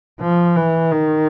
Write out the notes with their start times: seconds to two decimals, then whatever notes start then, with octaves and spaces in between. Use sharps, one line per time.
0.21 F3
0.56 E3
0.91 D#3